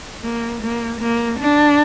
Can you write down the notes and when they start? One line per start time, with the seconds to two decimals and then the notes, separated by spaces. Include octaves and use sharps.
0.24 A#3
0.62 A#3
1.01 A#3
1.39 D4